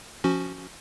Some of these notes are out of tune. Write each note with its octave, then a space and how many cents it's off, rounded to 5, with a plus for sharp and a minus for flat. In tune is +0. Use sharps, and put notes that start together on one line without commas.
F3 +0 C#4 +0 F#4 +0